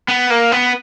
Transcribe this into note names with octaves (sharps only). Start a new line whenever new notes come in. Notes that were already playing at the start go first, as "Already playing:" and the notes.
B3
A#3
B3